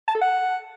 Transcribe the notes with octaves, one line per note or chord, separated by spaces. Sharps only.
A5
A4
F#5